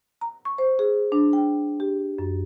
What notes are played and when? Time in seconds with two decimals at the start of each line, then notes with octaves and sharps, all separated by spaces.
0.21 A#5
0.45 C#6
0.58 C5
0.79 G#4
1.12 D4
1.33 G5
1.80 G4
2.18 F#2